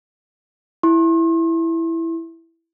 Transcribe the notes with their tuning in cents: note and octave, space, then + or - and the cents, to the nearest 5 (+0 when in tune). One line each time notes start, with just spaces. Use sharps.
E4 +0 C6 +40